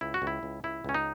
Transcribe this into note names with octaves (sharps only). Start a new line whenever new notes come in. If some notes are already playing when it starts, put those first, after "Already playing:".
C#2 E4
F#4
C#2
E4
C#2
C#2 E4
C#2 C#4
D#4